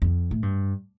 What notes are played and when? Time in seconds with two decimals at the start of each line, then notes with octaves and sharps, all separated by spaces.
0.02 F2
0.31 A2
0.43 G2